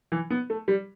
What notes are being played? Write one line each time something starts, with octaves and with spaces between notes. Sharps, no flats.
E3
B3
A3
G3